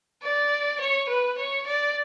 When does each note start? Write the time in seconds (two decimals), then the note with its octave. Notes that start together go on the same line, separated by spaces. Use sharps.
0.23 D5
0.79 C#5
1.09 B4
1.38 C#5
1.66 D5